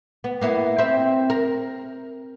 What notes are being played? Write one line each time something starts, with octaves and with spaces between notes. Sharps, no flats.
B3
A#3 B3 E4
C4 E5
A#4